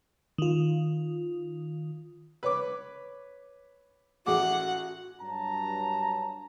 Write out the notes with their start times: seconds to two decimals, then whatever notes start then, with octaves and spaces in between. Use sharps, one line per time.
0.38 D#3 F4
2.43 B4 C#5 D6
4.26 A1 F#4 G#4 F#5 D6
5.21 G2 F#3 A5 A#5